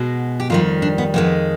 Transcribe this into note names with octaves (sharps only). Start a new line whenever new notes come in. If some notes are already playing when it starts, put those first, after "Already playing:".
Already playing: B2 G#3
G4
F2 D#3 G3 F4
D4
B3
F2 D#3 G#3 B3